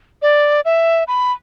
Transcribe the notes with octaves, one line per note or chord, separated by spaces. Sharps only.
D5
E5
B5